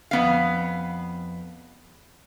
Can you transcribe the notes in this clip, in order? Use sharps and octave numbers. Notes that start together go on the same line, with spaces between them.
F2 B3 F5